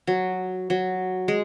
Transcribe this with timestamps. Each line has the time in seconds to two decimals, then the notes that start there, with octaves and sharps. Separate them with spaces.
0.07 F#3
0.70 F#3
1.28 G#3